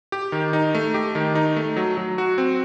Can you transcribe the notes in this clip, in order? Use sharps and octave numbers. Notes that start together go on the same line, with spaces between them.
G4
D#3
D#4
A3
G4
D#3
D#4
A3
F#3
F#3
F#4
C4